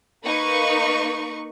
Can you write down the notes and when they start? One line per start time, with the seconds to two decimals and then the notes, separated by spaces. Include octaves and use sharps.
0.24 A#3 D#4 B4 C#6